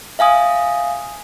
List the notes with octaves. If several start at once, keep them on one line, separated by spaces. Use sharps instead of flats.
E5 F5 G#5 D#6